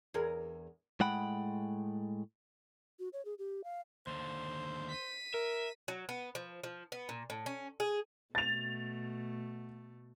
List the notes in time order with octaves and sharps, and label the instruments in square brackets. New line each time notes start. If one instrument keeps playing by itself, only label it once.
[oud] E2 G#4 A#4
[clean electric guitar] A2 G#3 F#5 G5 B5
[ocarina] F#4
C#5
G#4
G4
F5
[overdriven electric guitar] D#2 D3 [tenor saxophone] C5
[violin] B6 D#7
[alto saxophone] A#4 [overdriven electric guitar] E5
[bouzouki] F#3
B3
F3
F3
B3
A#2
A2
C#4
G#4
[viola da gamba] B2 A3 [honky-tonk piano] A6 F7